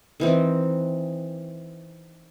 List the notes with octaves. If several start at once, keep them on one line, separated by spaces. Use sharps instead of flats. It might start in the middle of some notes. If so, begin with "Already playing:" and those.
D#3 E3 C4